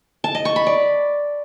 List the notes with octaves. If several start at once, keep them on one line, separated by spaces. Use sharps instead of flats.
A5
D#5
C#6
B5
D5